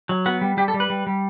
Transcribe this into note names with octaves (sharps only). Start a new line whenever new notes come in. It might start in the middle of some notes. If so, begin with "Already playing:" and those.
F#3
B3 F#4
G3
G3 G4
A4
G3
B4
G3
G3